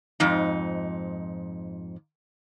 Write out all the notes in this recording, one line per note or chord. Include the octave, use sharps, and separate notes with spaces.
F2 G#2 D#4